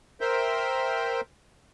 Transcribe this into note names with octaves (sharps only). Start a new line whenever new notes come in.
A#4 C5 E5 G5